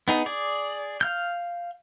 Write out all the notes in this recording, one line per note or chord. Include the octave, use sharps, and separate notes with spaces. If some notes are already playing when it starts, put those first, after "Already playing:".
B3 D#4 G#4
G#4 D5
F5 F6 G6